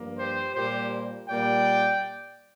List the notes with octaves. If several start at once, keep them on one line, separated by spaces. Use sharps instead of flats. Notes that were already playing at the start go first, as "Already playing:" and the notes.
Already playing: G2 F3 A#3
G4 C5
A#2 G3 A#3 G4 C5
A#2 G3 A#3 D5 G5